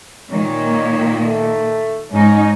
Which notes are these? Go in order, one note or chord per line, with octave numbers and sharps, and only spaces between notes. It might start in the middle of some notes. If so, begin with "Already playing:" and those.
A#2 D#3 A#3 C#5
A3
G#2 C#4 D#4